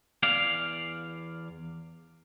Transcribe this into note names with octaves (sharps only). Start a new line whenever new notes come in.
E2 D5 F5